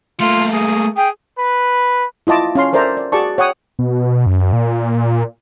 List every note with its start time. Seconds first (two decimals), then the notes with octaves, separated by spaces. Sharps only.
0.20 A3 A#3 F4
0.53 G#4
0.97 G#4 G5
1.38 B4
2.27 E4 F4 D#5 A5 D6
2.55 C#4 F5 C6
2.73 A4 A#4 C5 D5 E5 A#5
2.97 D5
3.12 F#4 G#4 D5 A5 C#6
3.38 C#5 F#5 G5 D#6
3.79 B2
4.26 F#2
4.53 A#2